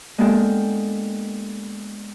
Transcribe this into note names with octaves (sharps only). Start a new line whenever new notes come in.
G#3 A#3 B3 D4 G4 A4